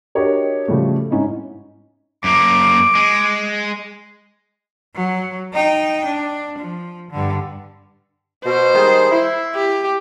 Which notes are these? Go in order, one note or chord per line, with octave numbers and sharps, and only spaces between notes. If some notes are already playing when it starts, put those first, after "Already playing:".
D4 F#4 G4 A#4 C#5 D#5
C#3 F3 G3 A3 F#4
G#2 C#4 D#4 E4
F#2 A#3 D6
G#3
F#3
D#4 G5
D4
F3
G2 D3
B2 C5
D#3 G3 G#3
E4
G4